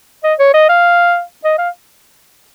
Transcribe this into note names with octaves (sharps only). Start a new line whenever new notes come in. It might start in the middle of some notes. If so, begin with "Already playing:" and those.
D#5
C#5
D#5
F5
D#5
F5